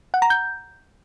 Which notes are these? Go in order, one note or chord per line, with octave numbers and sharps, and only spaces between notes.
F#5
A#5
G6